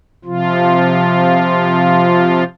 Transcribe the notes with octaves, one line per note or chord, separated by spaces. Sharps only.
C3 F3 F4